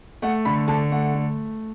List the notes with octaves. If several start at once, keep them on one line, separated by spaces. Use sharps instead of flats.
A3 F#5
D3 B5
D3 A5
A3 F#5
A3